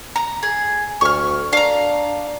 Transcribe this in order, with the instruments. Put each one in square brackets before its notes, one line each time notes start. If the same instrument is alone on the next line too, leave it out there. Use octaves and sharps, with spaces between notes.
[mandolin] A#5
G#4
[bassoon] D2 [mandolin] C#6 F6
[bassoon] D4 [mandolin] F5 A#5